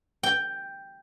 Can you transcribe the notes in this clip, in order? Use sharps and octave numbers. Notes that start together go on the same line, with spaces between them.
G5